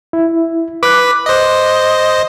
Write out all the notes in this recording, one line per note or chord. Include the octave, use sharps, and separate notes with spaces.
E4
B4 D6 F#6 B6
C5 D#5